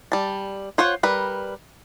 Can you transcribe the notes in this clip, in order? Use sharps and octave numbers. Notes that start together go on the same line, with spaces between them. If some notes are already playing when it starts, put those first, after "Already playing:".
G3 A5
F4 C5 C#5 F#5
G3 A#4 B4